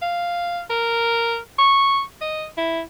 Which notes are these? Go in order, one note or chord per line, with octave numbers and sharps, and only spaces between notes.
F5
A#4
C#6
D#5
E4